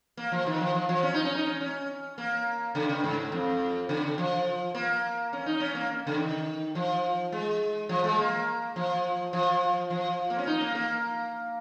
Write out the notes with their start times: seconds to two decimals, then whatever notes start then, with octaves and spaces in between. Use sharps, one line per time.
0.17 A#3
0.32 F3
0.46 D#3
0.61 F3
0.75 F3
0.89 F3
1.03 C#4
1.14 D#4
1.25 C#4
1.35 D#4
1.46 C#4
1.61 C#4
2.18 A#3
2.75 C#3
2.89 C#3
3.04 G#2
3.32 F2
3.89 C#3
4.18 F3
4.75 A#3
5.33 C#4
5.46 D#4
5.60 C#4
5.75 A#3
6.07 C#3
6.18 D#3
6.75 F3
7.32 G#3
7.89 F3
8.04 G#3
8.18 A#3
8.76 F3
9.33 F3
9.90 F3
10.30 A#3
10.38 C#4
10.47 D#4
10.61 A#3
10.75 A#3